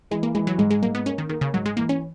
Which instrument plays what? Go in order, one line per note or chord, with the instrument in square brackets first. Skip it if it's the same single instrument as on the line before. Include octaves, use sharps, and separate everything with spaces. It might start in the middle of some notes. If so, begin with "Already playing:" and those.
[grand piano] E3 [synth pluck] G#3
[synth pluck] A#3
[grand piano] E3 [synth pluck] G#3
[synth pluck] F#3
[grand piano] G#2 [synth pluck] G#3
[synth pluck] G#3
[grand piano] G#2 [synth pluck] A#3
[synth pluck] B3
[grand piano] A#3 [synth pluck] C#4
[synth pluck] D#3
[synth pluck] D#3 [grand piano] A#3
[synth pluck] C#3
[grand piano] G#2 [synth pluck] F#3
[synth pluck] G#3
[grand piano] E3 [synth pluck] A#3
[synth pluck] C#4